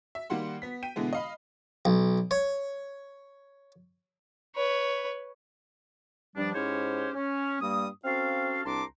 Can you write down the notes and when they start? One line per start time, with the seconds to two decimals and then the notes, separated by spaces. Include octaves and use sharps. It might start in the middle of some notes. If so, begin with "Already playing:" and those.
0.15 E5
0.30 D#3 G3 A#3 F#5 C6
0.62 B3 B6
0.83 G5 D#7
0.96 B2 D3 E3 G#3 B3
1.13 D#5 F5 B5
1.85 B1
2.31 C#5
4.56 B4 C#5
6.36 G2 F3 G3 D4
6.54 G#2 C#4 E4 G4 C5 C#5
7.15 C#4
7.61 G2 G3 A#3 D#6
8.05 C4 C#4 F#4 A4 F5
8.65 C2 D4 A5 A#5 C6 D6